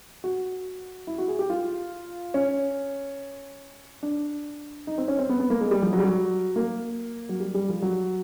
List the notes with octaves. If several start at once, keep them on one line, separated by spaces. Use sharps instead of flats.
F#4
E4
F#4
G#4
G4
F4
C#4
D4
D#4
C4
C#4
C4
B3
B3
A#3
G#3
G3
F3
F#3
G3
F#3
A#3
F#3
G3
G3
F3
F#3